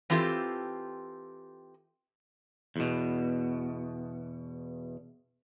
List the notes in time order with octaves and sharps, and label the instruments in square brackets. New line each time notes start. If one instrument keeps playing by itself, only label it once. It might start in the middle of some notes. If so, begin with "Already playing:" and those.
[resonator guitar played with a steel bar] E3 C4 F4 G4 A4
[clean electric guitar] E2 B2